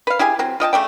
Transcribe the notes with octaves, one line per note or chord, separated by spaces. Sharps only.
B4 F5
E4 G4 G#4 G#5
F#3 C4
F4 D#5 G5 A5
C#3 A3 D5 G5